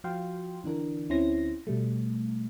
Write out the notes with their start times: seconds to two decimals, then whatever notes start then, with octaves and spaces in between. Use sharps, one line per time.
0.04 F3 F4 F#4 F5 G5 C6
0.64 D3 E3 D4 A#4
1.09 D2 C4 C#4 E4 C6 A#6
1.67 B2 G3 A3